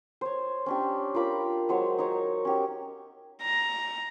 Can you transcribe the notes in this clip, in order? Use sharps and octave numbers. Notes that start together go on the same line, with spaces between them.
C5 C#5
C#4 D4 G4
F4 A#4 B5 D6
F#3 G#3 C5 C#5
D#4 A#4 C#5
C#4 G4
A#5